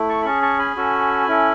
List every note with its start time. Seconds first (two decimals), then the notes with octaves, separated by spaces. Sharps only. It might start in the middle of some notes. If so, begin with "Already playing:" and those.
Already playing: A3 E4
0.09 A5 C#6
0.22 B5
0.25 C#4 G#4 A5 C#6
0.42 A5 C#6
0.59 G#5 B5
0.76 C#4 F#4 A4
1.27 C#4 E4 A4